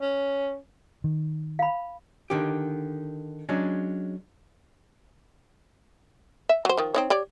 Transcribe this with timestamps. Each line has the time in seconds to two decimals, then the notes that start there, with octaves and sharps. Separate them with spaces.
0.02 C#4
1.04 D#3
1.59 F5 B5
2.30 D3 D#3 G4
3.49 F#3 G#3 C#4 D4
6.49 E5
6.65 F#3 C5
6.77 D#3 F3
6.94 C4 D#4 C#5
7.10 G4 C#5 D5